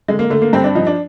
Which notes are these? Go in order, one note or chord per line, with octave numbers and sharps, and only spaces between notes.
D3 G#3
A#3
D3 A3
A#3
G2 C4
D4
F3 D#4
D4